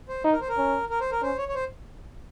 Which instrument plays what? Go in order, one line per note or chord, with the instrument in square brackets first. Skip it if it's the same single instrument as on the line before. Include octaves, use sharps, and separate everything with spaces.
[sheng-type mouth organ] C5
[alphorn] D#4
[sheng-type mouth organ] A#4
C5
A#4
[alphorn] C#4
[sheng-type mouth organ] A#4
C5
A#4
[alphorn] C#4 [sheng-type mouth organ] C5
[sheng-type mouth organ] C#5
C#5
C5